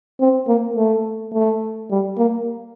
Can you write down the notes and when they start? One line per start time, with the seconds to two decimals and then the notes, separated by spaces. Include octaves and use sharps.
0.20 C4
0.48 A#3
0.76 A3
1.33 A3
1.91 G3
2.18 A#3